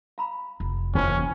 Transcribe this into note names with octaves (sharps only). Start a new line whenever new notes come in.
F5 A#5 B5
F1
D#2 E3 F3 C#4 C5 G5